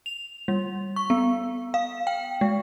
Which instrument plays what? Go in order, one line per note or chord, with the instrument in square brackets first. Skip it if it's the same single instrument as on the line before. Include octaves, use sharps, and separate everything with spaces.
[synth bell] F7
G3
C#6
B3
F5
G5
G#3